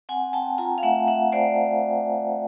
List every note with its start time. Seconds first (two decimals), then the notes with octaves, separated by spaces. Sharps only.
0.09 C4 F#5 G#5
0.33 C4 G5 A5
0.58 F4 G#5 A#5
0.78 F5
0.83 A3 E5 F#5
1.07 A3 E5 F#5
1.32 A3 C5 D5